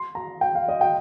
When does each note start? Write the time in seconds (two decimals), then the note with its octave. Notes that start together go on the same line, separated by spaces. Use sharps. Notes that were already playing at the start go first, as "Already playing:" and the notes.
Already playing: C6
0.15 A#5
0.41 G5
0.55 F5
0.68 D#5
0.81 G5